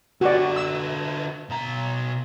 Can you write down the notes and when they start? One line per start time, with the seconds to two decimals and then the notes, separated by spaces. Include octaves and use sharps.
0.21 D3 F#4 B4 D5
0.56 E6
1.49 B2 A#5